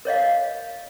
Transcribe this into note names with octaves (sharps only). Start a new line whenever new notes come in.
A#4 C#5 D#5 F5